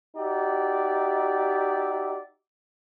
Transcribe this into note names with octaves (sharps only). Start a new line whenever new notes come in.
D#4 F#4 G4 D5 E5